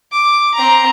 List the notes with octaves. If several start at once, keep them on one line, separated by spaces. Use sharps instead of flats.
D6
C4 A#5